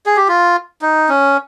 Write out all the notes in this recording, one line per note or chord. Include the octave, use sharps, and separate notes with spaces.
G#4
G4
F4
D#4
C#4